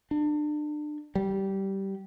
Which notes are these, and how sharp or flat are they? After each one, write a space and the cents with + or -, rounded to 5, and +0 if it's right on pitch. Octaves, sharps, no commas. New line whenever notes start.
D4 +30
G3 -15